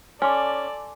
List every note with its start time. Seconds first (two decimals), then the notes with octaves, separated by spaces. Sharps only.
0.22 C#4 A4 D5 G#5 C6 D6